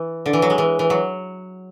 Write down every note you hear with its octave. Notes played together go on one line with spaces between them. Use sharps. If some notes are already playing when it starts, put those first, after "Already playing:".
Already playing: E3
D3
E3
F#3
G#3
E3
E3
F#3